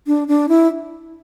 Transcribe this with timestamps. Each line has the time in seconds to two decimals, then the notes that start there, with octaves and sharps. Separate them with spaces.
0.07 D4
0.28 D4
0.49 E4